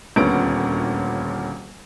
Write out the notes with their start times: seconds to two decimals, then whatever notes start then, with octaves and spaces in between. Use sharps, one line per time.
0.16 D#1 D2 A#2 B3 C#4 D7